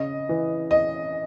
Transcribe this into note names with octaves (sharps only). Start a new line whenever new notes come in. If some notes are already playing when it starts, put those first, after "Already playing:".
Already playing: C#3 D#5
E3
D#5